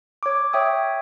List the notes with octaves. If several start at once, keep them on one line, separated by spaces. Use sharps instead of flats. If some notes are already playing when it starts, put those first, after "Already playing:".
C#5 D6
C#5 E5 G5 D#6